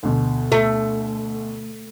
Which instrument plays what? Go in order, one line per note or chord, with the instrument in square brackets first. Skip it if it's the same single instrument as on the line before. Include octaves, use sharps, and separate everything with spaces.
[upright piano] D2 B2
[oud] A3